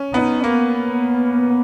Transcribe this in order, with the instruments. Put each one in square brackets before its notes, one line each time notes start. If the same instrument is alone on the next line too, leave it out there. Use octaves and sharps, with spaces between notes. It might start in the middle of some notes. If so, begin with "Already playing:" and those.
Already playing: [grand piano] C#4
[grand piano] B3 [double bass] D#4
[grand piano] A#3 [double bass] B3